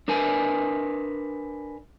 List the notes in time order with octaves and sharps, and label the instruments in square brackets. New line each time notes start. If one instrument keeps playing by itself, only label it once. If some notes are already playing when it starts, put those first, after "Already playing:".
[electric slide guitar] D4 A#4 B4 G#5